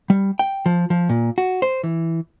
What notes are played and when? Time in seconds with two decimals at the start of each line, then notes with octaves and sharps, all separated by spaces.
0.10 G3
0.39 G5
0.66 F3
0.90 F3
1.09 A#2
1.38 F#4
1.62 C5
1.84 E3